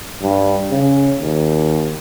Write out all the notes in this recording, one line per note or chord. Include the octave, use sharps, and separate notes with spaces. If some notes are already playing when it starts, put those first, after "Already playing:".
G2
C#3
D#2